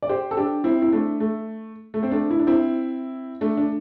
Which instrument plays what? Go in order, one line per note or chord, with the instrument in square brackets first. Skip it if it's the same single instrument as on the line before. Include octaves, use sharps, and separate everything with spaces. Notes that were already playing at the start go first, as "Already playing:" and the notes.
[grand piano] D5
G4 C5
A4
D4 G4
C4 E4
E4
A3 D4
A3
A3
C4
A3 D4
E4
D4
C4 E4
A3 D4
D4